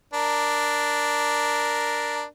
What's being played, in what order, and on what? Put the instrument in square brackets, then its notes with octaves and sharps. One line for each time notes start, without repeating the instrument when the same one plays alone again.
[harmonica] D4 A#4